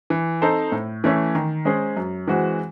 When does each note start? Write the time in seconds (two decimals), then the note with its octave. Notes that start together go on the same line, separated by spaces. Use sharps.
0.10 E3
0.42 C4 D#4 A4 C5
0.72 A2
1.04 E3 A3 C#4
1.35 D#3
1.65 G#3 C#4 G#4 C5
1.97 F#2
2.28 E3 G#3 C4 F#4